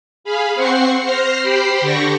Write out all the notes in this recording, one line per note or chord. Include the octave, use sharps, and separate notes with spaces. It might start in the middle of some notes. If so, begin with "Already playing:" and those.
G#4 F5 B5
C4 C5 F#5 C#6 C7
C5 F6 A#6 C7
G4 C5 G5 B5 C6
D3 G4 D5 C#6 A#6